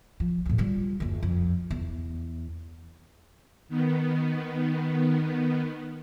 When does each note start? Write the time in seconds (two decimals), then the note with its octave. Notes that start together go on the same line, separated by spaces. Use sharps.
0.20 F3
0.46 D2 A2
0.58 G3 F4
1.00 F#1 D#2
1.23 F2
1.71 E2
3.68 D#3 B3